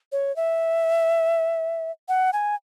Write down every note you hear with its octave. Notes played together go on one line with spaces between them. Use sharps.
C#5
E5
F#5
G#5